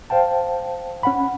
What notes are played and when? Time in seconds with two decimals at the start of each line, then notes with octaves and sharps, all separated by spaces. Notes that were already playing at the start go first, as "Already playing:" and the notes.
0.10 C5 F5 G5 A5
1.03 C#4 F#5 B5